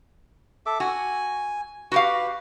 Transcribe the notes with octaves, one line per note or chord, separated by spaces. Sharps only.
A4 E5 D6
F#4 G#5
F#4 G4 B4 F5